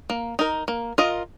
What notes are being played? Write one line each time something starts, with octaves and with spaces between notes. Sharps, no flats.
A#3
D#4 A#4
A#3
F4 A#4 D#5